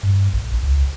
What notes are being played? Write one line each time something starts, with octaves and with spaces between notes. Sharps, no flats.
G2
A#1
C#2